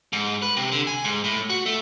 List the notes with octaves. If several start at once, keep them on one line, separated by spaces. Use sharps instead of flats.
G#2
B4
C3
D3
G#5
G#2
A2
F#4
A3